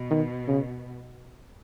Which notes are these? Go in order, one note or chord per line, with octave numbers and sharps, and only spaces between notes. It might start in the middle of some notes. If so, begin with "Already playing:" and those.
Already playing: B2
D#3
C#3